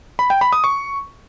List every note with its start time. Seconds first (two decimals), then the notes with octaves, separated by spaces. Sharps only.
0.19 B5
0.30 G5
0.41 B5
0.53 D#6
0.64 C#6